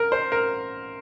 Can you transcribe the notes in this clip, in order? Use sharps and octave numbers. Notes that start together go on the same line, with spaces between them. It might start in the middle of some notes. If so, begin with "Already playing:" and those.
Already playing: A#4
C5
A#4